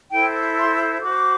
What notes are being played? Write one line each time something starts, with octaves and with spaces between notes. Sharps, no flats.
E4 A4 C5 G5
C6
F#4 C5 D6